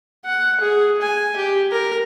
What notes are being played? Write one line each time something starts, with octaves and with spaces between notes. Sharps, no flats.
F#5
G#4
G#5
G4
A#4